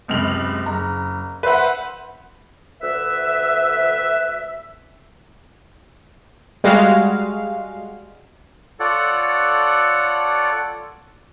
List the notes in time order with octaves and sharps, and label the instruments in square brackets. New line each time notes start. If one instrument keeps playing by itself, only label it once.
[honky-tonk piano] F#1 C#2 C3 G#3 F7 F#7
F#1 A#5
B4 C5 E5 F#5
[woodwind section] D2 B4 E5
[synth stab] G3 G#3 F#4 F5
[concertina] F4 A4 C#5 D5 F#5